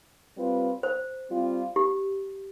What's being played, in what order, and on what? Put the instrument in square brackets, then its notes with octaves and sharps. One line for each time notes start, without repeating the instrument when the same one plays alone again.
[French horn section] G3 C4 F4 B4
[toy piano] C5
[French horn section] G3 C4 F4
[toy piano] G4